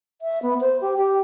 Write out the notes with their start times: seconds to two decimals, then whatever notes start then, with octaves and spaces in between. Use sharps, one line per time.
0.22 E5
0.42 B3
0.61 C5
0.81 G4
0.98 G4